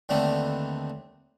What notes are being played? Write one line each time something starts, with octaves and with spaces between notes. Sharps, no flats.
D#2 D3 A3 B3 C4